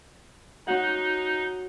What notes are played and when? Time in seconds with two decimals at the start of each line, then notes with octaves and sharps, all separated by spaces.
0.67 C#4 D#4 F#4 F#5